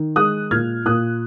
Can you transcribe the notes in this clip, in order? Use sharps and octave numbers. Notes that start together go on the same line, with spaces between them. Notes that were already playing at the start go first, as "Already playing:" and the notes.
Already playing: D#3
G#3 D#6 F#6
A#2 F6 G#6
A#2 D#6 F#6